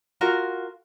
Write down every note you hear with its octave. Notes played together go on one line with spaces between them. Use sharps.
F4 F#4 A#4